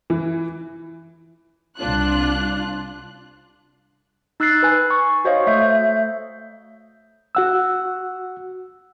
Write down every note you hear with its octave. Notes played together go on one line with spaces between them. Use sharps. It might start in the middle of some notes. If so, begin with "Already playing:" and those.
E3
C2 D4 F4 F#6
D#4 E6 F#6 A6 C7
B4 G#5
C#6
F#4 C5 C#5 D#5 F5
A3 E5 G6
F#4 F#5 E6